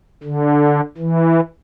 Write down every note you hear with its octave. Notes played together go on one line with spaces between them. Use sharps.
D3
E3